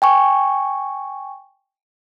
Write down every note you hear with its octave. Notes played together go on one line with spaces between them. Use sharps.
G5 G#5 C#6